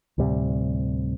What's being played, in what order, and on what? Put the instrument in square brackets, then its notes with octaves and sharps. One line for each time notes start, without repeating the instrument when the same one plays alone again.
[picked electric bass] D2 A2 C3 G3